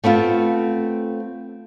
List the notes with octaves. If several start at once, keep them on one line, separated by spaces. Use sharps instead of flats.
A3 B3 C4 F4